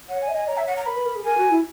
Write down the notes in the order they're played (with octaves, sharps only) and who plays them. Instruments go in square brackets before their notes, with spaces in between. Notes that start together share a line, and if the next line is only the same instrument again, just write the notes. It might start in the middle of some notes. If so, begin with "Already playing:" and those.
[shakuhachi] C#5 [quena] F#5
[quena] G#5
[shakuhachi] E5
[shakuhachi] D#5 [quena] G#5
[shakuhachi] C#5 [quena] A#5
[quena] E5
F#5
A#5
[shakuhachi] A#4 [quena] B5
[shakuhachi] B4
A#4
G#4
[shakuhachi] A#4 [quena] G#5
[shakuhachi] F#4
E4